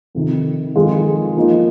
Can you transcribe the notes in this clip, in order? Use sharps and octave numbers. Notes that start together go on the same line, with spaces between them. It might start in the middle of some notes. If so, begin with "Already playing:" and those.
F2 C3 D#3
F2 D#3 G#3 F4 G#4
F3 A#3 D#4 A#4